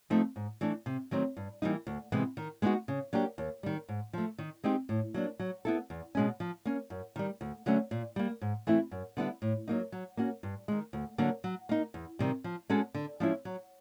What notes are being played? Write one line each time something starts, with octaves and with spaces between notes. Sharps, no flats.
F3 A3 C4 D#4
G#2
E3 A3 D4
C3
D#3 F#3 A3 C4
G2
E3 G3 A#3 D#4
D2
C3 E3 G#3 B3
D#3
G#3 B3 D#4 F#4
C#3
F#3 A#3 D4 G4
D#2
D#3 G3
G#2
F3 A3
D#3
G#3 C4 D#4 G4
A2
F#3 A#3 D4
F#3
B3 E4 A4
E2
B2 G#3 C#4
F3
A#3 C#4
F#2
D#3 G3
D2
D3 F#3 A3 C#4
A#2
G3 A#3
G#2
E3 A3 C4 E4
F#2
D3 G3 B3 E4
A2
F#3 A#3 D#4
F#3
A#3 C#4 F#4
G2
D#3 G#3
D2
D3 F#3 A#3
F#3
A#3 D#4
E2
C3 D#3 G3
F3
G#3 C#4 F#4 A4
D3
F3 G#3 C#4 E4
F#3